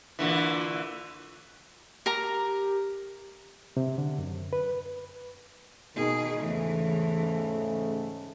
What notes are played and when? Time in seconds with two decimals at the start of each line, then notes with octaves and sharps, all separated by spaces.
0.19 A#2 D3 E3
2.06 G4 A#4 A#5
3.77 C3
3.98 D3
4.18 F#2
4.53 B4
5.96 B2 D#3 G#4
6.39 E2 G#2 C#3 E3 A3